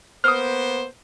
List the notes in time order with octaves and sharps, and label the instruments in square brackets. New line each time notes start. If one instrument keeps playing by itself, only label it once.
[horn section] A#3 B3 C5 [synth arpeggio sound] D#6 F6